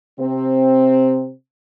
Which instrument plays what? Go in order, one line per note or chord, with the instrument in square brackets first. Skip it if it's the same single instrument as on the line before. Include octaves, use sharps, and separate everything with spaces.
[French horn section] C3 C4